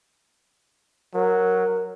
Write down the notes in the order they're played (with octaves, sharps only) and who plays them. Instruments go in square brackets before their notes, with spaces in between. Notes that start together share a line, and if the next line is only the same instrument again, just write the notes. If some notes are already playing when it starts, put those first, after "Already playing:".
[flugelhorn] F#3 [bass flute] A#4